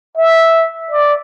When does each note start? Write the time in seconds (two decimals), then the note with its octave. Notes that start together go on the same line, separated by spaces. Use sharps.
0.17 E5
0.91 D5